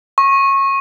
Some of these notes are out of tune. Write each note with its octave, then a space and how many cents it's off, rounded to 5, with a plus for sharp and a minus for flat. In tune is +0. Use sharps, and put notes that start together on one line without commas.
C#6 -20